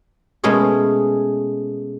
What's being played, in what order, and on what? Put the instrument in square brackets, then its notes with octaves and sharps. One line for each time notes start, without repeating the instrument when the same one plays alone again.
[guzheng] B2 G#3 A3 C#4 G#4